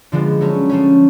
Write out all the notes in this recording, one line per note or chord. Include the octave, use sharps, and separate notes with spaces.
D3 F3 G#3 B3
F#3 A3 C#4
F3 A3 C#4